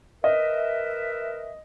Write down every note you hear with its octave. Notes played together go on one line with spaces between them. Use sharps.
A#4 B4 D#5 E5